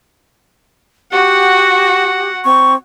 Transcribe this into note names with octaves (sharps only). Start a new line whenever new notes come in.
F#4 G4 F#5
C4 C#6